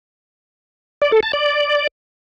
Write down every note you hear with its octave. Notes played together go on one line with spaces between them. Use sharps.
D5
A4
A5
D5